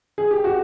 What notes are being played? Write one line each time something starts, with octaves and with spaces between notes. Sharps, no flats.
G#4
G4
F#4